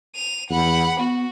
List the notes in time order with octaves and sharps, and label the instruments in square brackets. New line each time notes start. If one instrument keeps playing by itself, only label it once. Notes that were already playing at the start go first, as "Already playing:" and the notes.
[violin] D#7 F7
[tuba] E2 [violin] F#5 B5
[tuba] B3 [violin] F#4